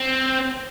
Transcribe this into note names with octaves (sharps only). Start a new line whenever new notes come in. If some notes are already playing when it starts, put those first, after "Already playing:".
Already playing: C4